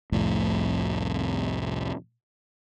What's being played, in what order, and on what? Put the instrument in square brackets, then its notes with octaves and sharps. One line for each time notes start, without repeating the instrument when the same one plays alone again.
[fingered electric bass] C2 F2 A2 C3